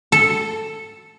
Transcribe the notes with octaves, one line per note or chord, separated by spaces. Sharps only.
A4